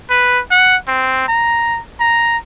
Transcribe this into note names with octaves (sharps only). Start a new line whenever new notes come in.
B4
F#5
C4
A#5
A#5